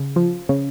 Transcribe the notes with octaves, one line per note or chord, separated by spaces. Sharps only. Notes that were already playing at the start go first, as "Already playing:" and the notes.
Already playing: C#3
F3
C#3